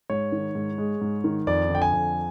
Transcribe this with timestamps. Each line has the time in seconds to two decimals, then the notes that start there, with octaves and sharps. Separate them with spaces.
0.10 G#2 C#5
0.32 D#3
0.55 G#2
0.78 G#3
1.01 G#2
1.24 D#3
1.47 F2 D5
1.70 D3 G5
1.82 G#5
1.93 F2